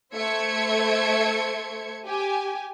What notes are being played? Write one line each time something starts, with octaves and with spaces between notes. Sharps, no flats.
A3 C5 E5 G#6 C#7
G4 G#5